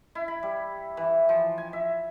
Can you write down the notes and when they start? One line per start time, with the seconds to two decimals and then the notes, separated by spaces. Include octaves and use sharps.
0.15 E4
0.28 B5
0.43 G3
0.97 E3
1.29 F3
1.58 G#5
1.73 E5